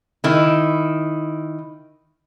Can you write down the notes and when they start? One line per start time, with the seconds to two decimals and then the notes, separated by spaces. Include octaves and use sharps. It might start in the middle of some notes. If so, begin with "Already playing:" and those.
0.24 D#3 E4